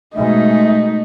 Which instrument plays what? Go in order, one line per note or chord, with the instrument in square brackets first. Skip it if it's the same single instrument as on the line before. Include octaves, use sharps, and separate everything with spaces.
[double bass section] G#2 B2 G#3 [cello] A3 [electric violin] D#4 [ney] E5